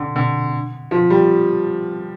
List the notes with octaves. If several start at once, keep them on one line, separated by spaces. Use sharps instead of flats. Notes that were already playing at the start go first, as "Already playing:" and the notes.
Already playing: D3
D3
F3
G3